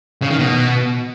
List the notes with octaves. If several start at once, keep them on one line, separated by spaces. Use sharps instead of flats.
C#3
D#3
B2